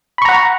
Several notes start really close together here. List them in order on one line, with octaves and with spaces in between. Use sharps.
B5 C#6 A#5 F#5